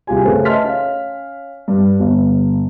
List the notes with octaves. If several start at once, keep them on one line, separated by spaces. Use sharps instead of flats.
C2 F4 G4 G#4 G#5
C#3 A3 G#4 B4 C5
D#5 E5 A5 C6 F6 B6
C#4 F5
G2
G1